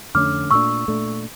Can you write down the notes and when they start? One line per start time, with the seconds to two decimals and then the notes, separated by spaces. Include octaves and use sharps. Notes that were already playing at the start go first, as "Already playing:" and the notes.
0.14 F2 D3 A3 C#4 D6 F6
0.51 A#2 A3 D4 C#6 E6
0.88 A#2 A3 D4